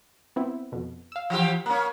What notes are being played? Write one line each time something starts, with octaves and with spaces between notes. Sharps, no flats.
B3 C4 E4
F2 B2
F5 E6
E3 F3 G4
A#3 C#4